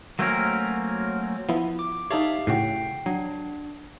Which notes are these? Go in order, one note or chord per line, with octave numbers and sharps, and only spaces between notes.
F#3 A3 A#3 C4 C#4 A#4
F3 B3 E4
D6
D#4 G4 A4 C#5 E5 F5
A2 C#3 F#4 G5 C7
F#3 D4